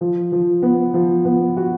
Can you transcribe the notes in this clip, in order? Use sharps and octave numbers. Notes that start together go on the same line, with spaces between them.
F3
F3
B3
F3
B3
F#4